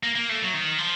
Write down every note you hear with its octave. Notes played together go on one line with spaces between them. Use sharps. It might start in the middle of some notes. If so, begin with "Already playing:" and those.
A#3
A#3
A3
F#3
D#3
F3